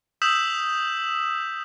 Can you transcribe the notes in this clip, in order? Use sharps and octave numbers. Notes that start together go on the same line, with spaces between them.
D#6 E6 G6 B6 E7 F#7